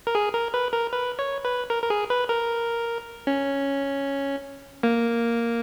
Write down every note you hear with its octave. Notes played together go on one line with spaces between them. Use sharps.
A#4
G#4
A#4
B4
A#4
B4
C#5
B4
A#4
A#4
G#4
B4
A#4
C#4
A#3